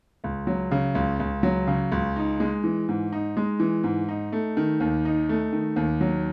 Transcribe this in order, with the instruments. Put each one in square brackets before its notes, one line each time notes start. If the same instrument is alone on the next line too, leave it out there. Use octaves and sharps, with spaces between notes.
[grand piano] C#2
F#3
C#3
C#2
C#2
F#3
C#3
C#2
D#4
G#3
E3
G#2
D#4
G#3
E3
G#2
D#4
A3
D#3
D#2
D#4
A3
D#3
D#2
F#3